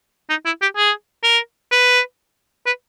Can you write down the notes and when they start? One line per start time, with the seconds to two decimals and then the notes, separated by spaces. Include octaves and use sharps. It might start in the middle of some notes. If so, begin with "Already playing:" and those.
0.30 D#4
0.46 E4
0.62 G4
0.77 G#4
1.24 A#4
1.72 B4
2.66 B4